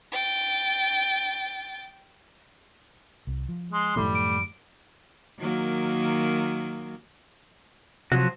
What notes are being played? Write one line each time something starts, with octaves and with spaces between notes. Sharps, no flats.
G5 A6
C2
F3
G#3 C6
F#2 A2 D#3 F3 G3 A3
D7
D#3 F#3 A#3
C3 F3 F#3 F#4